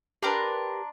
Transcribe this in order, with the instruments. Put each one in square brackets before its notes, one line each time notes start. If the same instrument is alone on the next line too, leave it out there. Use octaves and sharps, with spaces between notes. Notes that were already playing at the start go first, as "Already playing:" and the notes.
[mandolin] D4 A#5 C6 [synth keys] G4 A#4 B4